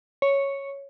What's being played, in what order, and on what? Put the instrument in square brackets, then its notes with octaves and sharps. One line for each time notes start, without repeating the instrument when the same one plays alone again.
[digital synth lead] C#5